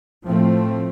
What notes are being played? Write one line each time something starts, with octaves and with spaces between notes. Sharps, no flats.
A2 F3 A3 C4